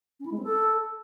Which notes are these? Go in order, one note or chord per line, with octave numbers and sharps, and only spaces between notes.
C#4
E4
G#3
C4
A4